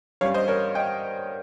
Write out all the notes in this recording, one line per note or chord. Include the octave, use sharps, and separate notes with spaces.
G2 G3 C#4 C#5 F5
C5 D#5
A#4 C#5
D#5 G5